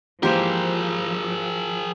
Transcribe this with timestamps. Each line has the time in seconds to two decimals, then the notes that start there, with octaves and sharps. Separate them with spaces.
0.23 G#2 E3 F3 A#3 G4 G#4 A#4 C5